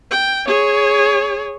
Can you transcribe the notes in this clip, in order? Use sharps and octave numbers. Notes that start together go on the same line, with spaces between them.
G5
G#4 C#5